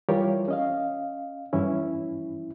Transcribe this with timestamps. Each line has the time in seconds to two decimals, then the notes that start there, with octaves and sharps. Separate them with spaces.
0.09 E3 G3 F4 G4 A#4 C#5
0.48 C#4 D#5 F5
1.53 G2 E3 C#4 E4